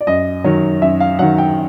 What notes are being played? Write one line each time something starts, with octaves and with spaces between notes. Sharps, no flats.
D5
F#2 D#5
D#3 F#3
F#2 E5
F5
D#3 F#3 F#5
G5